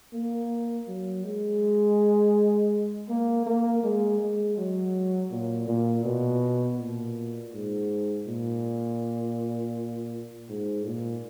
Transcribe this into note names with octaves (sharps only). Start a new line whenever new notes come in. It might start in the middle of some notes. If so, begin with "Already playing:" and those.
A#3
F#3
G#3
A#3
A#3
G#3
G#3
F#3
A#2
A#2
B2
A#2
G#2
A#2
G#2
A#2